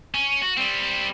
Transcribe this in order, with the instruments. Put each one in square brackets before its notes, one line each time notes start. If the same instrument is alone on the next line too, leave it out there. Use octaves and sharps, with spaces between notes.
[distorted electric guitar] C#4
F#4
G3 C4